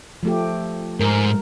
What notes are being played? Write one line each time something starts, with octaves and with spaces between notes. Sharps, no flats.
F3 A3 G4
G#2 A#4